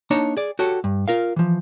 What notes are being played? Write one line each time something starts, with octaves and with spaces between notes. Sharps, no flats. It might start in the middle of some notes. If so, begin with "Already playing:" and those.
A#3 D4 D#4 C#5 A5 A#5
G#4 D5
F#4 G4 A4 C#5
G2
F4 A#4 F5
E3 F3